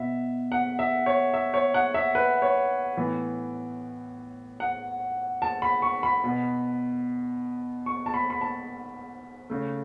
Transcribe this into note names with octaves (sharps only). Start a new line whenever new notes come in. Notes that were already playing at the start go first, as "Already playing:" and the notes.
Already playing: B2 B3 E5
F#5
E5
C#5
E5
C#5
F#5
E5
B4
C#5
A2 E3 B3
F#5
A5
B5
C#6
B5
B2 B3
C#6
A5
B5
B5
A5
C#3 A3